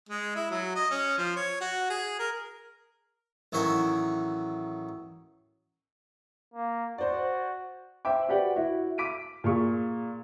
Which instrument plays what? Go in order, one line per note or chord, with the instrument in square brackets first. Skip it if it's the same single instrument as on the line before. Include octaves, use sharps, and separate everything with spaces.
[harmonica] G#3
E4
F#3
D#5
C#4
F3
C#5
F#4
G#4
A#4
[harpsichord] A1 D#3 F#3 F#4 E5 G#5
[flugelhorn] A#3
[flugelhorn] F#4 [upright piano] C5 D5
[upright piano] C5 E5 G5 D6
F#4 G4 B4 D5 F#5 G5
E4 F#4
D6 B6 D7 D#7
A#2 G#4 C#6